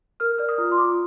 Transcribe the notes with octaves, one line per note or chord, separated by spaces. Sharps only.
A#4 F6
D5 F6
D#6
F4
C6
F4 D6